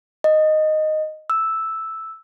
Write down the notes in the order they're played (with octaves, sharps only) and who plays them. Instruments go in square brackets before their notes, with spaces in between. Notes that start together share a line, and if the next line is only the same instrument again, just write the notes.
[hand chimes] D#5
E6